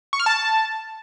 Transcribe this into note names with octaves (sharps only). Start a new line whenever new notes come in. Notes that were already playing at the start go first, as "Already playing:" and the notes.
C#6
F6
A5